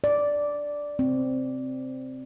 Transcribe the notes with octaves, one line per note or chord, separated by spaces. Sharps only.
D5
C4